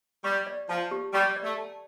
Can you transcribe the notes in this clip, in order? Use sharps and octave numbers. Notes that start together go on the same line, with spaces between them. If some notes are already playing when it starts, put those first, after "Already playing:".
G3 C#6
D5
F3 A5
G4
G3 C#6
D5
A3
A5